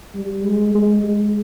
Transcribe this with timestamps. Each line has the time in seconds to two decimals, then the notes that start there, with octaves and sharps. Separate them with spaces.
0.15 G3
0.45 G#3
0.75 G#3
1.04 G#3